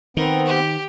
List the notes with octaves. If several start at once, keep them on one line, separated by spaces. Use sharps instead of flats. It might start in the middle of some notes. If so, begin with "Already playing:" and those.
D#3 B3 C4 A#4
G4